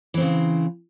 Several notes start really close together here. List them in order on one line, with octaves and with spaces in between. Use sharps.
E3 C4 C#3